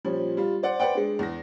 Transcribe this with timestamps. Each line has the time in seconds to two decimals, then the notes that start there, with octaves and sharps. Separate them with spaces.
0.05 A#2 F3 G3 C#4
0.37 G3 F4
0.63 C5 D5 F#5
0.80 B4 C5 D5 F#5 G5
0.95 G#3 D4
1.19 E2 A#6